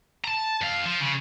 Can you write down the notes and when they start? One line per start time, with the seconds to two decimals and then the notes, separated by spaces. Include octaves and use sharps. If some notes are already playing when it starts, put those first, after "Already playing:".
0.24 A5 A#5
0.61 F2 F5
0.85 F3
1.01 C#3